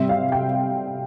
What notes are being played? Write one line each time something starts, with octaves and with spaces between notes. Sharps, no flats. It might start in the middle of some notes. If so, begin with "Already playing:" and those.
Already playing: C3 G3 C4 E5
F5
G5